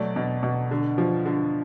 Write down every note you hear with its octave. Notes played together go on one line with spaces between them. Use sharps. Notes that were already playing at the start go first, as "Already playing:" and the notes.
Already playing: B2 F#3 A3 D5
B2
B2
D3
F3
D3